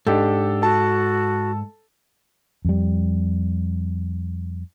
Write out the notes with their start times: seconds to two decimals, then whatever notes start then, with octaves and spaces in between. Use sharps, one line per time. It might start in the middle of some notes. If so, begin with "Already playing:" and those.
0.07 G#2 D4 G4 A4
0.62 F#4 A4 A5
2.65 F2 G3